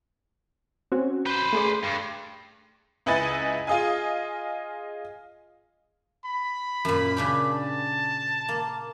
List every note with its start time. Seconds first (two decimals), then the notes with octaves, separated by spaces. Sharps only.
0.92 C4 C#4 F#4
1.27 B4 C5 G6
1.53 A3 G#4 D5
1.83 G2
3.06 C#2 E4 B4 D#5 G#5 A6
3.67 F4 G#4 D#5 F5 G#5
6.26 B5
6.85 F#2 A#2
7.17 C#3 D4 G4
7.51 A5
8.49 A#3